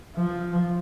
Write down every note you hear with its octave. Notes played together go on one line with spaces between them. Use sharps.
F3